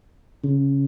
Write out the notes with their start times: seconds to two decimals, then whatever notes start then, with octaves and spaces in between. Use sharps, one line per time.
0.44 C#3